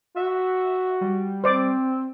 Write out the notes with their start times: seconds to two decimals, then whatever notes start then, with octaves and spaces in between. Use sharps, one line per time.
0.16 F#4 E5
1.01 G3
1.44 C4 C5 D5 D6